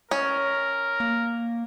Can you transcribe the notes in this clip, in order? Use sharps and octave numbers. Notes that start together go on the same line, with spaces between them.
C#4 A#4
A#3